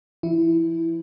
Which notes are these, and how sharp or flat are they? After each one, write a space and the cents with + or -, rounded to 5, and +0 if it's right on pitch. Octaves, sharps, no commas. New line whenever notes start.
F3 -35 E4 +0